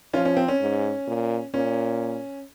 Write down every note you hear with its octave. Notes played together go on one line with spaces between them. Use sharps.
F3 C#4 F4
C#4
C4
C#4
G#2
A#2
A#2 C#4